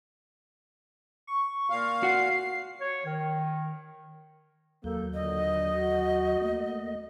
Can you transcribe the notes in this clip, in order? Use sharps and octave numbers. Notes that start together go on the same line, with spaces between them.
C#6
A#2 F5
F#4 F#5 C7
C#5
D#3
D#2 F#3 A#3 A4 G6
A#2 D3 D#5
F#4
A3 A#3